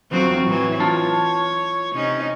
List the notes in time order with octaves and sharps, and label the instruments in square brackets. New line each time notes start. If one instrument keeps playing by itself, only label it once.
[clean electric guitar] E2 F3 F#3 [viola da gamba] C4 F4 F#4
[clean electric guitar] A2 [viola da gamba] E3 F#3
[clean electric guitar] F4 A5 [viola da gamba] C#5
[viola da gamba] C3 C#4 D#4